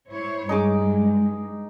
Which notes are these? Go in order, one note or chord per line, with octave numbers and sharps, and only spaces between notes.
E4 C5 C#5
G2 G#3 D#4 G#4 D6